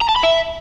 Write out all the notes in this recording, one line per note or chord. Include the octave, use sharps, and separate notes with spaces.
A#5
A5
B5
E5